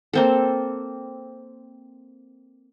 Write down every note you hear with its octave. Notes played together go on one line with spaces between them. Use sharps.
A#3 C4 A4